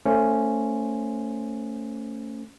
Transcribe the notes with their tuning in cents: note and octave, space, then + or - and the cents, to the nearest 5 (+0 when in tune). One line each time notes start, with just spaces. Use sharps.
A3 +30 C#4 +0 C5 +0